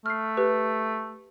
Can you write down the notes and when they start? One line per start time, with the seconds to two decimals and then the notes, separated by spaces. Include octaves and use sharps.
0.06 A3 F6 C7
0.37 G4 B4